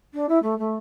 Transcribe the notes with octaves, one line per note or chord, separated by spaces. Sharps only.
D4
E4
A3
A3